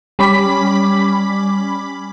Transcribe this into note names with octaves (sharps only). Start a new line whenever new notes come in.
G3 C#4 B5 D6 B6